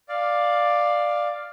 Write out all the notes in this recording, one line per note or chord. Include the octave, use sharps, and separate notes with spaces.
D5 F5